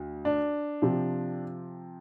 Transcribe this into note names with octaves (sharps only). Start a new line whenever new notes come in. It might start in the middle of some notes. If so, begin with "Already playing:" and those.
Already playing: D2
D4
C3 F3